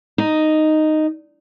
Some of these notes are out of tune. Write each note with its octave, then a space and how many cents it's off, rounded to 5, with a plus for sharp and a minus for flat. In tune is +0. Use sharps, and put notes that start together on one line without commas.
D#4 -5